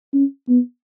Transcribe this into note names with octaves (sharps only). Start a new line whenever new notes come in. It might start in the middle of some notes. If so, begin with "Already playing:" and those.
C#4
B3